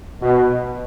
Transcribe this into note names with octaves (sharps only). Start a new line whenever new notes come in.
B2